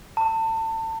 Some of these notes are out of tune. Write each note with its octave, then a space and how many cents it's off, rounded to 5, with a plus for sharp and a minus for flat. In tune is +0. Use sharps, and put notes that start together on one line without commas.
A5 +30